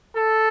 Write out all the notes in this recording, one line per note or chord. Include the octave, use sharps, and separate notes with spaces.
A4